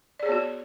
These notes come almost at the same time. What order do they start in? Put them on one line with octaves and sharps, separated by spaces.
D5 G#4 C#5 B3 F#4